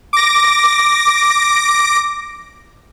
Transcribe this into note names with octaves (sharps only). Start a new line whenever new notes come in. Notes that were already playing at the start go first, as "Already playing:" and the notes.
D6 A#6